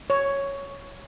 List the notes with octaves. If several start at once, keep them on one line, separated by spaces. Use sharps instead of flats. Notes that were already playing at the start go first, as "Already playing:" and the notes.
C#5